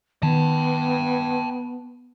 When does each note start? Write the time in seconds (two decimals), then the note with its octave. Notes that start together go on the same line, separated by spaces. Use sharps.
0.23 D#3 B3 G5 A5